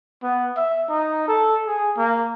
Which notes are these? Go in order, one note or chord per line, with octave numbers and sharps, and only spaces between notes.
B3
E5
D#4
A4
G#4
A#3